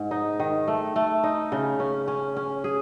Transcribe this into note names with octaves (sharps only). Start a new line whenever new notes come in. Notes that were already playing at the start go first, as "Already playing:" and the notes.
Already playing: G#2
D#4
D#3
A3
A3
D#4
C#3
C#4
C#4
C#4
G#4